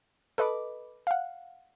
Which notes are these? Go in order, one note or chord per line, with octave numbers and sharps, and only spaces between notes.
A4 B4 D#5 B5 D6
F5 F#5